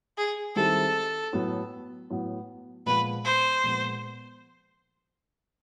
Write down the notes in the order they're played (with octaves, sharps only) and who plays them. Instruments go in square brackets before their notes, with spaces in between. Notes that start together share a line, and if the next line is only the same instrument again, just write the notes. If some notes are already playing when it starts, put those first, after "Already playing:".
[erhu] G#4
[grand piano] D#3 G3 C4 E4 G#4 [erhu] A4
[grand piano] A2 F#3 B3
A2 F#3 B3
[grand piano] A#2 F3 G#3 B3 [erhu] B4
[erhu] C5
[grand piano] A#2 F3 G#3 B3